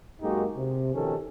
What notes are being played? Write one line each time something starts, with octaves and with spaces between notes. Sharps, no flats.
F#2 G#3 A#3 D#4 F#4 G4
C3
B2 D#3 F3 C#4 G4 A4